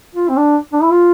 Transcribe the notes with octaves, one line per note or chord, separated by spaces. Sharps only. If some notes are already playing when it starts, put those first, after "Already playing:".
F4
C4
D4
D4
E4
F4